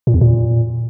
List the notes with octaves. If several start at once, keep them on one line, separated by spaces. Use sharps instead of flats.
A#2
E2
A#2